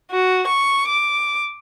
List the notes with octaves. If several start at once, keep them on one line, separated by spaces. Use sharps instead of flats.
F#4
C#6
D6